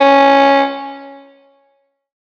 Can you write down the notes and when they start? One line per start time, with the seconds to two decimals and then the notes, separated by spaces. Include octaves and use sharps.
0.01 C#4